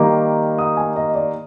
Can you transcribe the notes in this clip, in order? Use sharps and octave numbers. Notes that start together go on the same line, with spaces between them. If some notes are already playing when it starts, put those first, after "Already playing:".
Already playing: D#3 G3 A#3 D6
D#6
G#5
D#5
D5